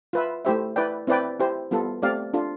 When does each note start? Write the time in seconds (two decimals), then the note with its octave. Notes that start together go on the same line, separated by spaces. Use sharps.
0.13 F4 B4 E5
0.45 A3 E4 G4 C5 E5
0.76 E4 B4 D5 G5
1.07 C4 E4 B4 D5 G5
1.40 E4 G4 C5
1.71 G3 B3 F4 A4
2.02 A3 C4 G4 D5 F5
2.34 D4 F4 A4